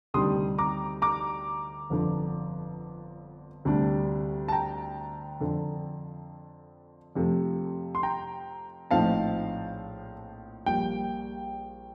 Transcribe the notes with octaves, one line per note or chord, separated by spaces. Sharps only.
D2 C3 D#3 G3 D4 C6 D#6
A#5 D6
A#5 D6
G1 F2 D3
D2 C3 G3 D4
A5
G5 A#5
F2 D3 F3
F2 C3 F3 A3
C6
G5 A#5
A#1 A2 F3 C4 D#4 F5 A5
A#1 A#2 G3 G5